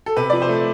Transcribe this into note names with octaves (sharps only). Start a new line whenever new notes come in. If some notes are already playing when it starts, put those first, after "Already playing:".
A4
C3 B4
F3 D5
C5
A3